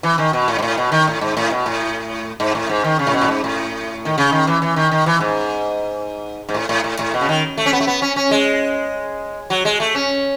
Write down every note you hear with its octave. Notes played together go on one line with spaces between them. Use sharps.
E3
D#3
B2
A2
G#2
A2
B2
D#3
A2
G#2
A2
B2
A2
G#2
A2
G#2
D#3
C#3
A2
B2
A2
G#2
A2
D#3
C#3
D#3
E3
E3
D#3
D#3
E3
G#2
G#2
A2
A2
A2
A2
B2
C#3
D#3
A3
C#4
B3
A3
B3
C#4
C#4
G#3
F#3
G#3
A3
C#4